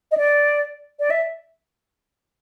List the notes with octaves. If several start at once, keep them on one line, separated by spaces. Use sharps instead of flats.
D#5
D5
D5
E5